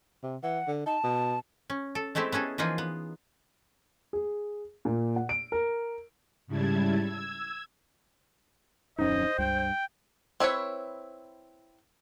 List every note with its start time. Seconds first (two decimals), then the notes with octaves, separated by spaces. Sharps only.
0.23 C3
0.43 E3 F#5
0.67 D3
0.86 D#4 A5
1.04 B2
1.70 C#4
1.95 A4
2.15 G#3 A3 C4 E4 G4
2.32 B3 C#4 G#4 A4
2.58 E3 F3 A#3 D#4 F4 G#4
2.78 B3
4.13 G#4
4.85 A#2
5.16 F#5
5.29 D7
5.52 A#4
6.47 G#2 C#3 G3 E4 A5 G#6
7.02 E6 G#6
8.99 D1 F2 C#4 D#4 C5 D#5
9.39 C#2 G2 G5
10.40 C4 E4 B4 C#5